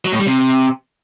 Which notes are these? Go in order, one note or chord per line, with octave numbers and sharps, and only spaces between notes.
F#3
A2
G3
C3